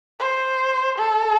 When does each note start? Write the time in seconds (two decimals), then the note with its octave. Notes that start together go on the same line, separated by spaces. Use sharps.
0.20 C5
0.98 A4